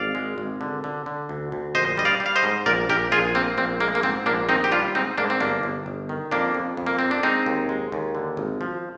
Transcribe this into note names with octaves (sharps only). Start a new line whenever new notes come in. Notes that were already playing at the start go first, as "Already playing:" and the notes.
Already playing: G#1 D5 F5
G#3
G#1
D3
D3
D3
D2
D2
A#1 C5 D#5
G3 D#5
D5 F5
G3
F5
C5 D#5
G#2
A#1 A#4 D5
A#1 G4 A#4
A#1 F4 G#4
A#3 C4
A#1 C4
G#3 A#3
A#3
G#2 C4
A#1 A#3 D4
D#3 C4 D#4
G4
G3 D4 F4
G#2 C4 D#4
G#2 A#3 D4
C4
G1 A#3 D4
G1
G1
D#3
F2 A#3 D4
F2
F2
A#3
A#3 C4
D4
G#3 C4 D#4
D#2
G#3
D#2
D3
G#1
F3